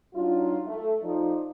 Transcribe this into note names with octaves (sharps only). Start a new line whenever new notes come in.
F#3 D4 D#4 F4
A3
F3 D#4 D5